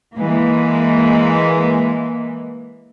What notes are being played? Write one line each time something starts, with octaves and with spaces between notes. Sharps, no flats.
E3 G#3 A#3